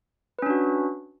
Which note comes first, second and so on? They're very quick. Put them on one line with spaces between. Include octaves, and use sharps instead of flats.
B4 C#4 D4 F#4